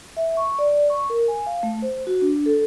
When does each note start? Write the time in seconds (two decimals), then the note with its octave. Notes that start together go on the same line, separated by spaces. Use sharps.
0.17 E5
0.37 C#6
0.59 D5
0.90 C#6
1.10 A#4
1.28 G#5
1.46 F5
1.63 A3
1.82 C5
2.07 F#4
2.22 D4
2.46 A4